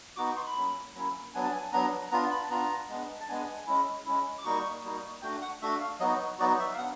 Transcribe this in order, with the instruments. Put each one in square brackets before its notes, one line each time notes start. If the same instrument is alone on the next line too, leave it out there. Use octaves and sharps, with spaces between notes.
[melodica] B3 D#4 F#4 D6
C#6
C6
B5
F#3 A#3 C#4 E4
F#3 A#3 C#4 E4
F#3 B3 D4 G#5
A5
G#5
F#3 B3 D4 A#5
B3 D4 F4 A#5
B5
A5
B3 D4 F4 A#5
G#3 B3 D4
A5
G#3 B3 D4 G#5
G#3 C#4 E4
G#3 C#4 E4
D6
G3 A#3 D#4 F#4 C#6
G3 A#3 D#4 F#4
A3 D4 F#4 G5
F#5
A3 D4 F#4 E5
F5
F#3 B3 D#4 F#4 D#5
F#3 B3 D#4 F#4 D5
E5
F5
B3 D4 F#5